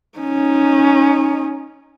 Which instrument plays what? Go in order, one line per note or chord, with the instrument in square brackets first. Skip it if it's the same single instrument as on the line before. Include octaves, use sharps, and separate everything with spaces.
[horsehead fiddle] C#4 D#4